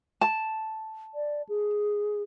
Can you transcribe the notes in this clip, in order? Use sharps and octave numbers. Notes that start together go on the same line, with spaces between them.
A5
D5
G#4